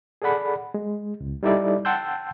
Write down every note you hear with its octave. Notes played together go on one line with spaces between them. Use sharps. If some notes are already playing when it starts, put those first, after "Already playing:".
G#4 A4 D5 F#5 B5
G#3
C#2
G3 D#4 E4 A4 D5 E5
F#5 G5 A5 C6 E6 G6